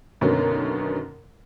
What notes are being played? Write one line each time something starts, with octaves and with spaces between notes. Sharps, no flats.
F#2 B2 D3 D#3 A#3 C#4